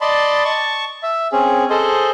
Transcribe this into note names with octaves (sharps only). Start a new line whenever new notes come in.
D5 D#5 A5 B5 C6
A5 C#6
E5
C4 C#4 G#4
G#4 A4 C5 D#5